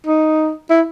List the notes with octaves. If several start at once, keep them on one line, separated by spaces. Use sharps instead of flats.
D#4
E4